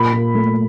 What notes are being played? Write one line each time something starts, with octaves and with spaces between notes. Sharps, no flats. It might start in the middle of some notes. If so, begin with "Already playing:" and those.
Already playing: A#2 B5
A#2
A3